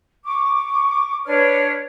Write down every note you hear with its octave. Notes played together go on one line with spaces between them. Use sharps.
C#6 D6
D4 B4 C#5 F6